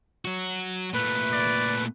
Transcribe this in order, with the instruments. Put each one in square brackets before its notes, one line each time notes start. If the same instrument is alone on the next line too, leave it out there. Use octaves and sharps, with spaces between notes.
[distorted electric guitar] F#3 F#4
[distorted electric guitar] A#2 A3 [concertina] B4
[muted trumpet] D5